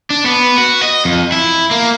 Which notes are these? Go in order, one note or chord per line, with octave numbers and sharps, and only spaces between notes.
D4
B3
F#4
D#5
F2
E4
A#3